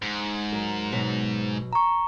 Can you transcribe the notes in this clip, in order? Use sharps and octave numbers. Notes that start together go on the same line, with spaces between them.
G#2
F#3 A#4
B2 F#3
A#5 C#6